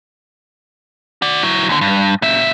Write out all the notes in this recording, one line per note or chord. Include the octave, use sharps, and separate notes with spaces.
F#4 D5
F#3 E4
D#2 D3
G2
A#2 E5